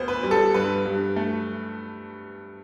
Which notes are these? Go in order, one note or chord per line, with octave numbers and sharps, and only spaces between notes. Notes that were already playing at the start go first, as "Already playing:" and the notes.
Already playing: D2 B3 C4 C5
B4
G3
A4
G2 B4
G2
A3